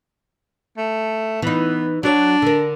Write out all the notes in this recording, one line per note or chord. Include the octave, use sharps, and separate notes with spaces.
A3
E3 B3 D#4
F#3 D4 F#4 C#5
D3 A#4